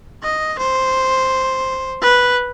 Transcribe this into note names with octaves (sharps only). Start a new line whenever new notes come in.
D#5
C5
B4